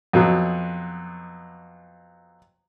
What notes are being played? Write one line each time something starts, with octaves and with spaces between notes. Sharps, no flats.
F2 B2 F#3